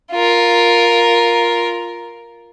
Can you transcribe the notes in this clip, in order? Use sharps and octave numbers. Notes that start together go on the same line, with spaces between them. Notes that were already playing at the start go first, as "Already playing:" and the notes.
F4 A#4